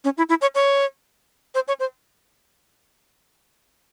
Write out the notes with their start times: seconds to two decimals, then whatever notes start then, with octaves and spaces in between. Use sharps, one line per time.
0.04 C#4
0.18 E4
0.29 E4
0.41 C#5
0.55 C#5
1.55 C5
1.68 C#5
1.80 C5